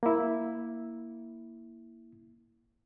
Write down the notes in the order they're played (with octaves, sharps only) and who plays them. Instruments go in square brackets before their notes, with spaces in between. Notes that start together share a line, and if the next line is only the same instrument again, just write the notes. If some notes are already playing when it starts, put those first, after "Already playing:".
[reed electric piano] A#3 E4